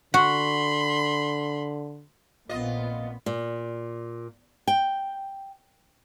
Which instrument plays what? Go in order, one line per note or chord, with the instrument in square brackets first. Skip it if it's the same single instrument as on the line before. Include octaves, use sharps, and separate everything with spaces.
[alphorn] D3 [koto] F#4 [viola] B5 C6
[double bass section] A#1 C4 [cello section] A#2 B3 [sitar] F4 D#5
[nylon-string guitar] A#2
G5